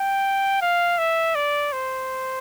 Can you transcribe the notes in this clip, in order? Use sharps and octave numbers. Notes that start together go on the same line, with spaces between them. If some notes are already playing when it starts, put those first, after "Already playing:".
Already playing: G5
F5
E5
D5
C5